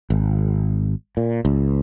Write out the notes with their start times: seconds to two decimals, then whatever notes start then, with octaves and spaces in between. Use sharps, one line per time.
0.10 G#1
1.17 A#2
1.45 C#2